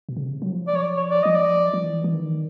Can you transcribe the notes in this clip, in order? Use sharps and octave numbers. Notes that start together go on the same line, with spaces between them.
B2
C#3
C3
F#3
F3
D5
C#5
D5
C#5
D5
F3 D#5
D5
F3
E3
E3
D#3